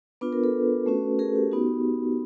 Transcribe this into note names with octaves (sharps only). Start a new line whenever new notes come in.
B3 D4 F4 B4
A#4
A4 B4
A3 C#4 F#4
G#4 A#4
G4
B3 D#4 F#4